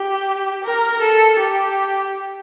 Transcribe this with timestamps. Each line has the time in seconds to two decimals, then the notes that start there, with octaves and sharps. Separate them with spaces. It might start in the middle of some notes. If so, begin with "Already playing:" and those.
Already playing: G4
0.64 A#4
1.02 A4
1.39 G4